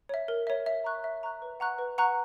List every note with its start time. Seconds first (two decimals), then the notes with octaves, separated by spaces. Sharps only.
0.09 C#5 E5
0.28 A#4
0.47 C#5 E5
0.66 E5
0.84 A#5 C#6 F#6
1.04 E5
1.23 A#5 C#6 F#6
1.42 B4
1.60 F#5 A#5 C#6 F#6
1.79 B4
1.98 F#5 A#5 C#6 F#6